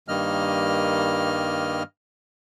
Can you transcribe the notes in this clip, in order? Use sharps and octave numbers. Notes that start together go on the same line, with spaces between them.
G2 D#3 G3 A#3 D#5 F6